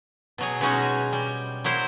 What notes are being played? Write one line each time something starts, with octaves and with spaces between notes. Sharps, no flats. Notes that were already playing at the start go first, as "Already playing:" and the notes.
B2 F#3 G#4
B2 F#3 G#3 C#4 D#4 F#4
G#5
G3
F#3 A#3 E4 C5